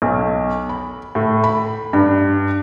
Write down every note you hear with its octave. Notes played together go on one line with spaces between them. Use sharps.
B1
B5
A2
B5
G2